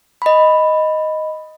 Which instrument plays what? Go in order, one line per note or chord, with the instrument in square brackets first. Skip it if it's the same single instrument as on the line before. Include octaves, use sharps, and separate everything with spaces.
[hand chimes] D#5 B5